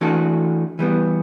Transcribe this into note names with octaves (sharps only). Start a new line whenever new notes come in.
E3 A3 D4 F#4 A4
E3 G3 B3